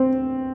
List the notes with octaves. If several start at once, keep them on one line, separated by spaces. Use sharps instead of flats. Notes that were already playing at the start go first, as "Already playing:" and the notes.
Already playing: C4